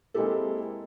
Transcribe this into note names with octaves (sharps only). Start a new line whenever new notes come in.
G#3 A#3 C4 E4 G4 A4